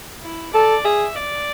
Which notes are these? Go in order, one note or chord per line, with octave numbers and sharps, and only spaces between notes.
E4
A4 D5
G#4 E5
D5